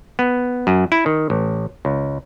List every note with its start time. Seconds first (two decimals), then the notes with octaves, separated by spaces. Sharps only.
0.19 B3
0.67 F#2
0.92 E4
1.06 D#3
1.30 A1
1.85 C#2